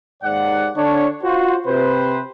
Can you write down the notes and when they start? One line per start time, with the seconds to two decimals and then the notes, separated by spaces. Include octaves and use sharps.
0.23 D#2 G#2 D5 F#5
0.76 D3 D4 C#5
1.24 F4 F#4 C5
1.67 C3 B4 C5